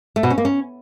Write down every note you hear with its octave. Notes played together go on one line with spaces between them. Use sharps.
A3
B2
C#4
A#3
C#4